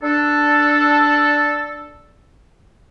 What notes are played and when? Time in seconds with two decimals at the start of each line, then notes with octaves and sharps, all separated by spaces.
0.03 D4 A4